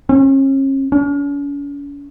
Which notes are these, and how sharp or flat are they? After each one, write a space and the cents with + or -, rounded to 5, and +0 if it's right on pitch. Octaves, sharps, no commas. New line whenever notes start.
C#4 -40
C#4 +45